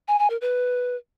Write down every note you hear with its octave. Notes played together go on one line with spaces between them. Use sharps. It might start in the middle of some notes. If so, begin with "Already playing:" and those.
G#5
G#5
A#4
B4